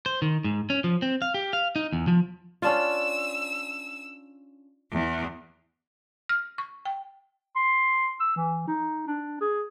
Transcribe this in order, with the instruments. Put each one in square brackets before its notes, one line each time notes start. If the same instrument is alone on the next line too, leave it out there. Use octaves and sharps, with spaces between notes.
[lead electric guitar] C5
D#3
G#2
C#4
F3
C4
F5
G4
F5
D#4
E2
F3
[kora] C#4 D4 F4 [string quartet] E6
[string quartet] E2
[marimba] F6
C#6
G5
[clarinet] C6
E6
E3
D#4
D4
G#4